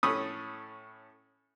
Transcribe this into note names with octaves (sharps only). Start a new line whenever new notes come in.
A2 C#4 A4 B5 C#6 D#6